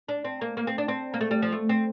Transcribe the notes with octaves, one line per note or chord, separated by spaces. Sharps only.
D4
C4
A#3
A#3
C4
D4
C4
A#3
A3
G3
F3
A3
C4